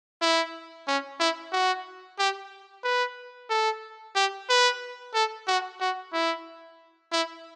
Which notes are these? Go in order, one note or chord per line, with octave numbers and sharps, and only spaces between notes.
E4
C#4
E4
F#4
G4
B4
A4
G4
B4
A4
F#4
F#4
E4
E4